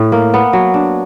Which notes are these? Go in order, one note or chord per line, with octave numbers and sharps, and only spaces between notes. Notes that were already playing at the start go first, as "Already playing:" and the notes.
Already playing: A2
A#3
B3
F#3
D4